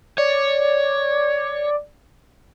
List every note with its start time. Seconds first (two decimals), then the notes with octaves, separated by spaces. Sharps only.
0.18 C#5 D5